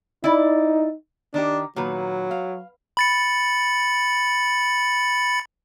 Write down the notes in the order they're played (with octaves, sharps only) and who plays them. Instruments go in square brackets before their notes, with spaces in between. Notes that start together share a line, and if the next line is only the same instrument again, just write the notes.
[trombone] D#4 [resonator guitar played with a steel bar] E4 D5
[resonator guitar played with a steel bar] D#3 D#4 G4 [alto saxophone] D4
[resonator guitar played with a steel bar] A#2 D#3 B4 [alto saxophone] F#3
[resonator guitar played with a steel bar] F5
[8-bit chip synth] B5 A6 C#7